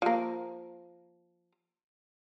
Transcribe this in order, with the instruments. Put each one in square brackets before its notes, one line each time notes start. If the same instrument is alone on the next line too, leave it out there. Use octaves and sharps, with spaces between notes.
[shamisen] F3 A#3